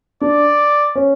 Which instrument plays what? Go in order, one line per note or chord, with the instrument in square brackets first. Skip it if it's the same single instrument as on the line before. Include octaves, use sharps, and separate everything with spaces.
[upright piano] D4 [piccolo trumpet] D5
[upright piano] C#4